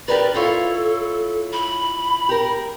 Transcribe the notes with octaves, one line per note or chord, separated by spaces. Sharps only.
G4 A#4 B4 D5
E4 F4 A4 C#5
B5
G4 A#4